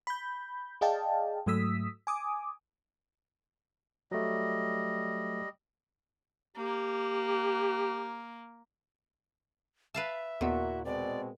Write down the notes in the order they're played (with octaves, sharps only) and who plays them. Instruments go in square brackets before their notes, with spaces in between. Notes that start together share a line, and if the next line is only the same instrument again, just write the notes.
[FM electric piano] B5 G6
G#4 D5 D#5 F5 G5 A5
G#2 F#3 A3 D#6 E6 B6
G#5 D6 D#6
[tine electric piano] F#3 A3 [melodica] G3 D#5
[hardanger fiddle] A#3 [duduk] G4
[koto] B4 F5 A5 [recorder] E5
[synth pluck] D#2 C#3 B3 [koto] A#2 [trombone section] A#3 E4 F#4
[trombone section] B2 G#3 C4 [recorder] D5